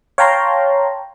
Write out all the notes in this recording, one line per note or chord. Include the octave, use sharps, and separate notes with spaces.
C#5 F5 G5 A5 A#5 C6